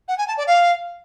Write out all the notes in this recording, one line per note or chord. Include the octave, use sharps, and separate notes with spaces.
F#5
G#5
A5
D5
F5